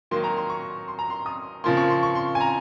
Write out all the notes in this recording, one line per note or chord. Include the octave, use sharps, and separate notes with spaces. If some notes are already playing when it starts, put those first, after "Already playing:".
D#3 F#3 A#3 C6
A#5
C6
C#6
C6
A#5
C6
D#6
C#3 F3 A#3 C6
C#6
C6
C#6
C6
G#5
A#5